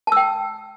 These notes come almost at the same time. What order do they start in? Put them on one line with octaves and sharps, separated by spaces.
A5 E6 G5